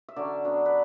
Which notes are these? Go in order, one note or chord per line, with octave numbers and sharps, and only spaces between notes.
E5
D3 F#3 C#4 D5
F#3 B3 D4
B4